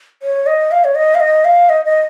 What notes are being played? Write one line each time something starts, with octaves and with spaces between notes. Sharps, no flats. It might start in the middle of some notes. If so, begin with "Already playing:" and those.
C#5
D#5
F5
C#5
D#5
F5
D#5
F5
D#5
D#5